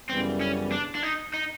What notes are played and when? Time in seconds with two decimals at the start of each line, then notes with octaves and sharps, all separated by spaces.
0.09 F#2 C#3 E3 G3 B3 C4
0.41 C#4
0.72 D4
0.95 D4
1.03 D#4
1.34 D#4